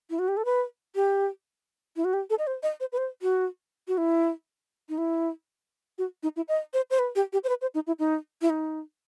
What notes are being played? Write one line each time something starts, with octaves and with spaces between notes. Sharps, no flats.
E4
F#4
G4
A4
B4
G4
E4
F#4
G4
A4
D#5
C5
D#5
C5
B4
C5
F#4
F#4
E4
D#4
E4
F#4
D#4
E4
D#5
C5
C5
B4
G4
G4
C5
B4
C5
D#4
E4
D#4
E4
D#4